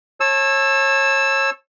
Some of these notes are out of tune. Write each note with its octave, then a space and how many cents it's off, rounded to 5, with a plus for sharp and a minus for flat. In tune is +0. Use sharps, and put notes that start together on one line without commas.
C#5 -30 A5 +0 E6 +0